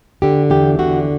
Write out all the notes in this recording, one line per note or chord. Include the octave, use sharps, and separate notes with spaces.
D3 G4
E2 G4
D3 F#4